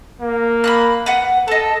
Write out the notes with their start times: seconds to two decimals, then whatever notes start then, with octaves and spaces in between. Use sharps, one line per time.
0.20 A#3
0.64 B5 D#6 F#6
1.06 B4 F#5
1.48 A4 D#5 A5